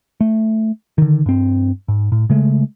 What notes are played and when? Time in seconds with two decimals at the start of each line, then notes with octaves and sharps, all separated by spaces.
0.21 A3
0.98 D3 D#3
1.26 G2 C4
1.88 G#2
2.12 A2
2.30 C#3 G#3 A3